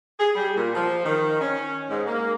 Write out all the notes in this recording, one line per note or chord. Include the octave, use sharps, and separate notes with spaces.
G#4
G3
A#2
F3
D#3
C#4
G#2
A#3